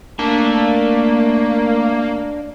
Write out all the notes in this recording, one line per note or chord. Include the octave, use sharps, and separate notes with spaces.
A3 A#3 D4 A5